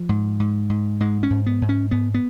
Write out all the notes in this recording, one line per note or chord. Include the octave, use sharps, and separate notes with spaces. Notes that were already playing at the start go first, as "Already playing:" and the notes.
Already playing: F3
G#2
G#2
G#2
G#2 G#3
C#4
G#2
B3
G#2
C#4
G#2 B3
B3